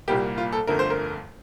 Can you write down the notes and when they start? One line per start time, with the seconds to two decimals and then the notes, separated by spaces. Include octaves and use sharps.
0.08 C2 A#2 G3 A#3 G4
0.38 F4
0.53 A4
0.67 G1 F2 D3 A3 A#4
0.79 C5
0.90 A#4